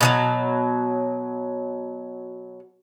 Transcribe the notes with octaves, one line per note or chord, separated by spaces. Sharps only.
B2 E3 F#3